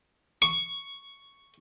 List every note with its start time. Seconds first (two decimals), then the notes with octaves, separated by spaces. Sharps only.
0.42 C#6